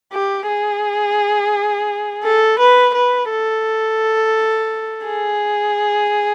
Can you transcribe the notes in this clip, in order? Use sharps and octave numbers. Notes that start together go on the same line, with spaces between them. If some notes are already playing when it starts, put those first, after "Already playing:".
G4
G#4
A4
B4
B4
A4
G#4